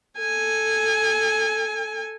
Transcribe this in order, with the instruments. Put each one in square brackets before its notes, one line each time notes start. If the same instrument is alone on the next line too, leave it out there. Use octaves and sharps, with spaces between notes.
[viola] A4 G#5